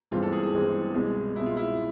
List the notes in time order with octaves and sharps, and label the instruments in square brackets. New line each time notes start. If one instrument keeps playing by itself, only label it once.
[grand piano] G1 G2 E3 G#3 C4 [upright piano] F4
[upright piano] A4
G#4
G#4
[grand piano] G1 G2 E3 G#3 C4
C2 B2 G#3
[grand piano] C2 B2 G#3 [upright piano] E4
[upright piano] F4
E4